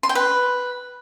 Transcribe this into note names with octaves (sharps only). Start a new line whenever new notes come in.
C6
G5
B4